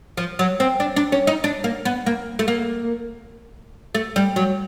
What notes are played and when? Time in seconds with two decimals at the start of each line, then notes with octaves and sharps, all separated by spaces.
0.17 F3
0.39 F#3
0.60 C4
0.80 D4
0.96 D4
1.12 C#4
1.27 D#4
1.44 D4
1.64 A#3
1.85 B3
2.06 A#3
2.39 A3
2.48 A#3
3.95 A3
4.16 G3
4.36 F#3